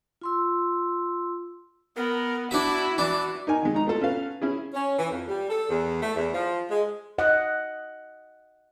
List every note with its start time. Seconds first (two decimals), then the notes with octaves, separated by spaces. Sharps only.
0.22 F4 C6 E6
1.96 B3 A#4
2.51 D4 E4 F#4 E5
2.98 E3 D4
3.47 D#4 A#4 G#5
3.62 D#3 G#3
3.74 D#4 A#5
3.87 A3 F4 A4
4.01 C#4 A4 B4 F5
4.42 C#4 E4 G#4
4.73 C#4
4.97 E3
5.11 F2
5.28 G3
5.50 A4
5.69 E2
6.01 A3
6.15 E2
6.33 F3
6.69 G#3
7.18 D#5 F#5